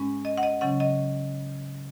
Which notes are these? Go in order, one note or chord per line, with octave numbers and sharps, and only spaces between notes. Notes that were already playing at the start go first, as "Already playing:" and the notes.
Already playing: G#2 G#3 C#4
D#5
F#5
D#5
C#3 F#3 C#4 F#5
D#5